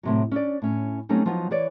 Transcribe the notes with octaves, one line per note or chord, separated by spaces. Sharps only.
A2 C3 F#3
C#4 D4 D5
A2 C#4
F#3 G3 A3 C4 C#4 D#4
F3 F#3 B3 D#4 F4
E3 B4 C#5 D5